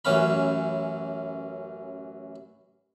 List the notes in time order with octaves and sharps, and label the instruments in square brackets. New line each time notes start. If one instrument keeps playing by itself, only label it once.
[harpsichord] A1 F#2 E3 C#4 F5 B5